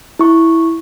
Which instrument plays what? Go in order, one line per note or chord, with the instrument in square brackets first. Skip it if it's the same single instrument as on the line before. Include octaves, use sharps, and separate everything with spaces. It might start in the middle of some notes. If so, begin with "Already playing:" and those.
[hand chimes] E4 C#6